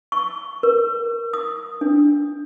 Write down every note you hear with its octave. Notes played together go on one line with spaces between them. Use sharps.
C#6
A#4
D#6
D4